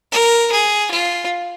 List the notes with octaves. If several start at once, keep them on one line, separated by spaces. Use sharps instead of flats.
A#4
G#4
F4